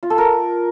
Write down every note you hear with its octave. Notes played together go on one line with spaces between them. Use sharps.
F4
A4
A#4